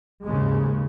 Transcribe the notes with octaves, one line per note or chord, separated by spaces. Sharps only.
D#2 G#2 C#3 G#3